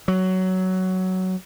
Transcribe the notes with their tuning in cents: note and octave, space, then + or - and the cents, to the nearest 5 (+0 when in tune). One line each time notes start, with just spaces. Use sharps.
F#3 +10